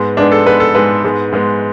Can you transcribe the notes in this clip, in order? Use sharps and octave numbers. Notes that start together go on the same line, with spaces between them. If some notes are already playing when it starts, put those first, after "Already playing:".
Already playing: G#2 G#3 B3 B4
G#2 G#3 B3 D4
A4
G#2 G#3 B3 B4
A4
G#2 G#3 B3 B4
G#2 G#3 B3
G#2 G#3 B3